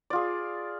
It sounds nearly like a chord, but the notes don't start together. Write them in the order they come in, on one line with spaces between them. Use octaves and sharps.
D5 F4 G#4